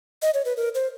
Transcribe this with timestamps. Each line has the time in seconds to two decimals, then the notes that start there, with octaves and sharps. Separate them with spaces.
0.22 D#5
0.34 C#5
0.45 B4
0.57 A#4
0.75 C5